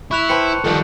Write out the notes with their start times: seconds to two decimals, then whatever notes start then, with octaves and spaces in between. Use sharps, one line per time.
0.11 E4 C#6 F#6 F7
0.29 B4 C5 G5 A5 C#7
0.65 D#3 F3 G3 A4